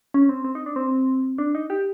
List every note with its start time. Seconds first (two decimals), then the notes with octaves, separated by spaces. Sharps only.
0.14 C#4
0.29 C4
0.44 C4
0.55 D#4
0.66 D4
0.76 C4
1.38 D4
1.55 D#4
1.70 G4